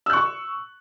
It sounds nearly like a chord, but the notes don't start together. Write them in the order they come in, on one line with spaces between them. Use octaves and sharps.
E6 F#6 C#6